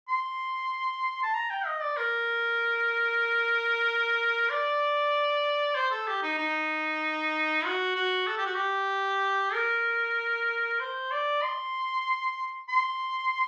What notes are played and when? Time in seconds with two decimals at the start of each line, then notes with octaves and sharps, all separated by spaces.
0.08 C6
1.23 A5
1.34 A#5
1.50 G5
1.66 D#5
1.81 D5
1.97 A#4
4.50 D5
5.75 C5
5.91 A4
6.07 G4
6.23 D#4
6.38 D#4
7.65 F#4
7.96 F#4
8.27 A4
8.38 G4
8.46 F#4
8.55 G4
9.53 A#4
10.80 C5
11.11 D5
11.42 C6
12.69 C6